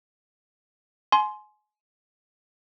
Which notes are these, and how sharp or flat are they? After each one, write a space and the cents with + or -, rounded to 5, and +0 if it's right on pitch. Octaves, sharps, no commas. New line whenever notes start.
G#5 +30 C6 +0